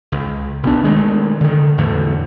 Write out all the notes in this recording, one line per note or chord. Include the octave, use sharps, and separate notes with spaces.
C#2
B1 B3 D4
D#3 G#3 A3
D3 D#3
E2 A2 D3